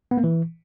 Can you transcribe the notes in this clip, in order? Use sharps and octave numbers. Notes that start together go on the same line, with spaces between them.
B3
A#3
E3